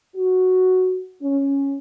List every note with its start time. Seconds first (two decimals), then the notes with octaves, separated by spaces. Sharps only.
0.16 F#4
1.22 C#4